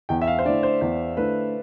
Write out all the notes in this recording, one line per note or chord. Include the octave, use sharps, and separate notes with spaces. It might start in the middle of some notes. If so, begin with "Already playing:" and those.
E2 G5
E5
F5
C5
D3 A3 E4 D5
C5
E2 C5
D3 A3 E4 B4